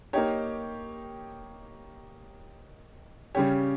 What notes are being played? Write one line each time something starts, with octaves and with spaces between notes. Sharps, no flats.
A#3 D#4 G4 C#5
C#3 G3 C#4 G4 C#5